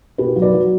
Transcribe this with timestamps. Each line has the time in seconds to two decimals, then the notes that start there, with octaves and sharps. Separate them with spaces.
0.18 B2 G4 B4
0.36 F#3
0.42 B4 D5
0.54 F#3